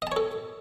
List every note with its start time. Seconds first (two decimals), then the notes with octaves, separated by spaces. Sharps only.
0.02 D#5
0.07 A5
0.12 C#5
0.16 A4